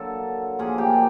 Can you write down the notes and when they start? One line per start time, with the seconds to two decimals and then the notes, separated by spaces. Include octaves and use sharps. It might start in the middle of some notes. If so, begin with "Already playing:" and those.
Already playing: D3 F#3 A#3 A4
0.59 A#2 F3 A#3 G#4
0.78 G4